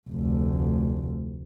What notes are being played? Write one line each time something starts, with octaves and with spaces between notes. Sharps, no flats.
F1 D2